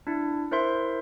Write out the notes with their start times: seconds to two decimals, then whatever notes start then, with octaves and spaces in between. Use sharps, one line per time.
0.07 D4 E4
0.51 E4 A#4 C5 E5 C6